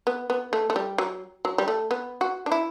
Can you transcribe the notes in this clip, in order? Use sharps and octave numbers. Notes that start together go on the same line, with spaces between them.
B3
B3
A3
A3
G3
F#3
F#3
G3
A3
B3
F#4
D4
E4